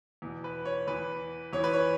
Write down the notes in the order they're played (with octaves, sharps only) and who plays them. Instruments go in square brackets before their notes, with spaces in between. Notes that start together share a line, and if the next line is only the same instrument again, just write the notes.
[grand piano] E2 B2
B4
C#5
E2 E3 B4
E2 E3 C#5
B4
C#5